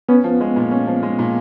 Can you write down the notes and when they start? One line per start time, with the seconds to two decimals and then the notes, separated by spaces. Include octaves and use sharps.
0.08 B3 C#4
0.24 F3
0.41 G#3
0.56 A#2
0.71 C#4
0.87 F3
1.03 G#3
1.19 A#2